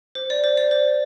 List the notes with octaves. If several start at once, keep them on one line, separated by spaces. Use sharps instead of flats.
C5
D5
C5
D5
C5